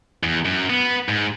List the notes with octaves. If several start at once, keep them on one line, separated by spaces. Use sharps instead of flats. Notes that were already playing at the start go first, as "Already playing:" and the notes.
E2
F#2
B3
G#2